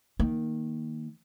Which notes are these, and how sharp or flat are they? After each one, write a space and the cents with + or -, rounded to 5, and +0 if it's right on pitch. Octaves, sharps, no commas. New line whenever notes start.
D#3 +0 A#3 +0